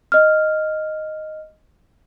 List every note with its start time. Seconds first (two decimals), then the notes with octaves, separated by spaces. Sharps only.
0.12 D#5 F6